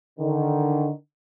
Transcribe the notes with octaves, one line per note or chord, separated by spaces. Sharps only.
D3 D#3